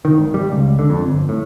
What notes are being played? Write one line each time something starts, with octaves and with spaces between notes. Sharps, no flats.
D#3
G#1
G3
C#2
D3
F2
G1
A2